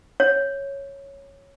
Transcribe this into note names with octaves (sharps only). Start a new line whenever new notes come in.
C#5